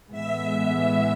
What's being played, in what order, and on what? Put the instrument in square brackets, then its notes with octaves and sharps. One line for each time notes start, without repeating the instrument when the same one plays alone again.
[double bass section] A2 E3 G#3 B3 [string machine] E5